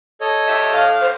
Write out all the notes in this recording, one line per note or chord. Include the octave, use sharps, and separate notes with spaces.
A4 C#5 D#5
E2 G4 E5
A2 F5
C5